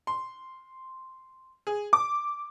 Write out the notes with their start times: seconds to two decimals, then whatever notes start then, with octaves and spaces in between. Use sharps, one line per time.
0.07 C6
1.67 G#4
1.93 D6